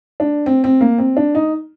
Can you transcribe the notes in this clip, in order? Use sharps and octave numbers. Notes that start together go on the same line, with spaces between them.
D4
C4
C4
A#3
C4
D4
D#4